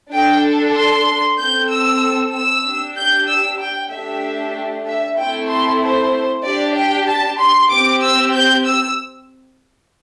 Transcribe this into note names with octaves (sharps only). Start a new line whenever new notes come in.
D4 A4 G5
C6
C4 A4 G6
E6
E6
D4 G4
G6
E6
G5
A3 D4 G4 E5
E5
A3 C4 E4 A4 G5
C6
C5
D4 G4 D5
G5
A5
C6
C4 G4 D6
E6
G6
E6